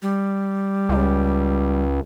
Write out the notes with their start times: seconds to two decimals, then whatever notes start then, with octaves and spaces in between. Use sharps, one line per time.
0.02 G3
0.89 C#2